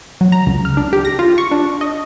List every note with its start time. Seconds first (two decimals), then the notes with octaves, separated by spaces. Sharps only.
0.21 F#3
0.32 A#5
0.47 C#2
0.65 F6
0.77 D4
0.93 G4
1.05 A#6
1.19 F4
1.38 C#6
1.51 D4
1.81 D#5